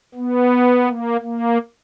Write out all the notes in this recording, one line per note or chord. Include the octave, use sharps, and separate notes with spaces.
B3
A#3
A#3